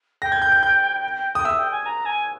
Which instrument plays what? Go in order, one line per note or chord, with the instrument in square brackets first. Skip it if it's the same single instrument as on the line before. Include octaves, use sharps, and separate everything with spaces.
[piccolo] G5 [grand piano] A#6
[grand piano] G#6
G6
G6
G6
[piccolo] G5 [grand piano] D#6
[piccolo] E5 [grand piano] E6
[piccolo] G5
G#5
A#5
G#5